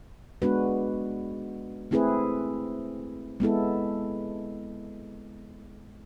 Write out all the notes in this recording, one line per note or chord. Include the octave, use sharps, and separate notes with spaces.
G#3 B3 D4 F#4 B4
A3 C4 E4 G#4 B4
G#3 B3 E4 A4